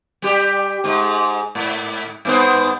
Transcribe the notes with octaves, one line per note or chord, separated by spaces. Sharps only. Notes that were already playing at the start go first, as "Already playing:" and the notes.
G3 G4
G#2 G#3
G#2
G2 B3 C5